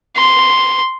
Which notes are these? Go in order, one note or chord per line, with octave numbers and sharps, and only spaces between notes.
C6